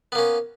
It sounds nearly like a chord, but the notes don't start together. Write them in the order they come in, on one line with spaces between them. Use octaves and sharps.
B3 A#3 C#4